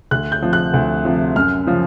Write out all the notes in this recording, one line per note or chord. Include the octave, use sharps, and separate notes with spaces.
D2 F#6
G6
C3 F3
F#6
D2
C3 F3
F#2 F6
C#3 F3